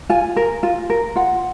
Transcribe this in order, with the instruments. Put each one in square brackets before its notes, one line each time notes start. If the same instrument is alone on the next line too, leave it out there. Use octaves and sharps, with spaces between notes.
[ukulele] F4 G#5
A#4
F4
A#4
F4 F#5